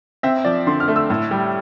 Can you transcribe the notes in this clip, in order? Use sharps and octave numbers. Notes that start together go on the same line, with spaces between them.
C4 E5
F3 D5
D3 C6
F6
A3
E6
A2
G3